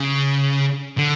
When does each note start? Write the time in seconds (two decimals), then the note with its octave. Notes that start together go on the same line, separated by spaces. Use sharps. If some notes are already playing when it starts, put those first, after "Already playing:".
Already playing: C#3
0.98 D3